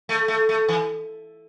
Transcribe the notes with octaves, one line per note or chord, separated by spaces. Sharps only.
A3
A3
A3
E3